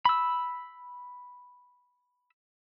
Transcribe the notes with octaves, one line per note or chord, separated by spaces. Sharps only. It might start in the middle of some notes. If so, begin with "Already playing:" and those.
B5 E6